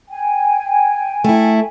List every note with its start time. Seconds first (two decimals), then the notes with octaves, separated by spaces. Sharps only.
0.09 G5 G#5
1.24 A3 E4